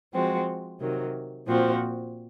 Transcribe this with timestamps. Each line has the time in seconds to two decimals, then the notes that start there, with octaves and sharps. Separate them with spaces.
0.12 F3 G#3 C4 F#4
0.80 C3 D#3 F#3
1.48 A#2 F3 C4 F#4